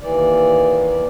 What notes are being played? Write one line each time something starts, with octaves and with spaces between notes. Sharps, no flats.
D#2 E3 D5